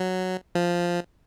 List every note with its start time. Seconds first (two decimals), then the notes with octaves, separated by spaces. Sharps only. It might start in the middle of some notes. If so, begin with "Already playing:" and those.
Already playing: F#3
0.55 F3